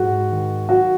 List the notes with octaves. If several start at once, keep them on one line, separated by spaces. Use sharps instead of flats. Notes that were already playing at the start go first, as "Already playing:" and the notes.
Already playing: G#2 F#4
D#3
F#3 F#4